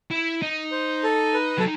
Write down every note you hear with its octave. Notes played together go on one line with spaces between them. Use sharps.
E4
D#4
C5
A4
B4
F#3 A4